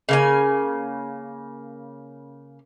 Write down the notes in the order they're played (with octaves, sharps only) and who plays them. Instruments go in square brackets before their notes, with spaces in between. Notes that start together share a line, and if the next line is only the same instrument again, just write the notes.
[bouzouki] C#3 A#3 G#5